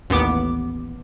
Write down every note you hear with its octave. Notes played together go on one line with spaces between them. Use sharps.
A1 D#2 B3 D6